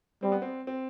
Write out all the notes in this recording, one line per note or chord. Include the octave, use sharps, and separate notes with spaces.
G3 C4
B3
C4
C4